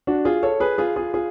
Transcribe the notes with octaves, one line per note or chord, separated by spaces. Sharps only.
D4 F#4
F4 G#4
A4 C#5
G#4 B4
F4 G#4
F4 G#4
F4 G#4